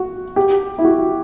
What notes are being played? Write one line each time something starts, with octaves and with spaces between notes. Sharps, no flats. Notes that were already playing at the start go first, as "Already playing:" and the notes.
Already playing: F#4
G4
E4
F#4